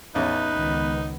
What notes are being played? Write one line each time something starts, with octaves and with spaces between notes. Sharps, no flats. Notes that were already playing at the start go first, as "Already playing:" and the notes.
A1 E2 C#4 D#4 B4
C#2 D#3 B3